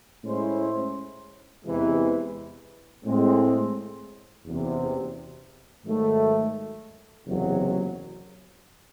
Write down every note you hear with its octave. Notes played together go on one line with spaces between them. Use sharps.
A2 G#3 C#4 E4 C5
E2 C3 E3 G#3
A2 G#3 C4
F#1 E2 C3
G#2 D#3 F#3 A3
F#1 E2 C3 F#3